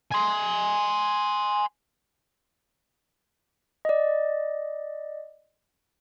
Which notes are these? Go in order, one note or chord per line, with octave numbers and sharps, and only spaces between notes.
G#5 C6
D5 D#5